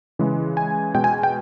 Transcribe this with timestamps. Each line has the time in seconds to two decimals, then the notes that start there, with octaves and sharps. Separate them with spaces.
0.19 C#3 E3 G#3
0.57 G#5
0.95 B2 G#3 G5
1.04 G#5
1.23 G5